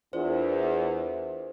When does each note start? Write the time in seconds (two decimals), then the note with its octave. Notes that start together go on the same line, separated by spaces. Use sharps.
0.13 E2 D4 F4 A#4 C5 D5